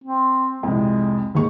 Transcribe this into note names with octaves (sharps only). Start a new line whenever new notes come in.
C4
C2 F2 G#3
D#2 G#2 C#6